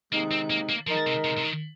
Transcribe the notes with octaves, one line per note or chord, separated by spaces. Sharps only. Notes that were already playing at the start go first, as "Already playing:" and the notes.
C3 D#3 G#3 A#3 D#4
C4
A#3
A#3
F3 G#3 D#4 A#4
C3
C3
C3
D#3